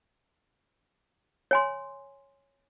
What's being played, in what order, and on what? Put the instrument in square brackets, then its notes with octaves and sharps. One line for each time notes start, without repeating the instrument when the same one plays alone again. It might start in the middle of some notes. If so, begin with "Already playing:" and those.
[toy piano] C#5 G#5 C6